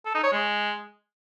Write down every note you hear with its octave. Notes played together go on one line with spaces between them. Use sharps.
A4
D#4
C#5
G#3